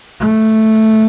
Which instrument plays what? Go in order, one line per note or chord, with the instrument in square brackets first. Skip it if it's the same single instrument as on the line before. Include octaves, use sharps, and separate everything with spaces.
[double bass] A3